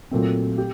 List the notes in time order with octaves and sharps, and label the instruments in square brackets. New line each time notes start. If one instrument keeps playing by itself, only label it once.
[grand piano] A#2 F#3 A3 C4
G4